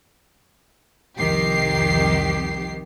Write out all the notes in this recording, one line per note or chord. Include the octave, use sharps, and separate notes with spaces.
C2 F2 D#3 G4 C7